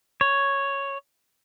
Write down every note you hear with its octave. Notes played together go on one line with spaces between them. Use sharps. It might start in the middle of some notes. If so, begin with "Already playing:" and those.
C#5